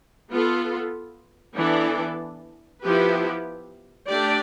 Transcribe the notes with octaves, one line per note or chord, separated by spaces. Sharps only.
B3 F4 A4
E3 B3 D4 A4 D5
F3 B3 E4 G4 B4
A3 D4 G4 D5